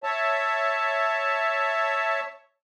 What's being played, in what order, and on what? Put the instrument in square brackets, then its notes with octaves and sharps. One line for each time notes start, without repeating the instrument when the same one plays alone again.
[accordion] C#5 E5 A5